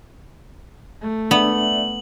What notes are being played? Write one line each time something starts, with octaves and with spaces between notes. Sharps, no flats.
A3
B3 D4 D5 E5 F#7